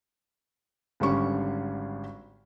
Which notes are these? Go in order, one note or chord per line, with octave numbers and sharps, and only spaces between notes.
G#1 D3 G3 C#4 C#6